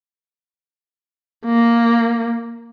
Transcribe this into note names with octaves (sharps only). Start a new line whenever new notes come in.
A#3